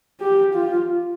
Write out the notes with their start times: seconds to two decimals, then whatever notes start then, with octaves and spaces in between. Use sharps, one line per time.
0.21 G4
0.54 F4